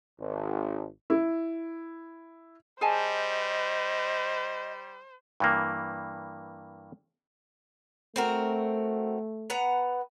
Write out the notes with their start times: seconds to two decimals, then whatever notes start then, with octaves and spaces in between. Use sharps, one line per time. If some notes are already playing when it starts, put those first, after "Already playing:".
0.21 G#1
1.10 E4
2.81 G3 G#4 C5 D#5 G#5 A5
5.40 G2 E3 A#3
8.16 A3 C4 F#4 A#4
9.50 B3 F#5 A#5